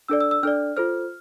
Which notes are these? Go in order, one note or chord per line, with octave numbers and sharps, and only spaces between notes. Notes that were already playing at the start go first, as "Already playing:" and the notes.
D4 A4 D5 E6
E6
E6
D4 A4 D5 F6
F4 A4 C5 F6